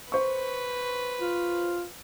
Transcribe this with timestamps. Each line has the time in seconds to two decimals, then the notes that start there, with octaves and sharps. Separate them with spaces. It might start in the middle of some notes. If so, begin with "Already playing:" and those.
0.12 B4 C5 C#6
1.20 F4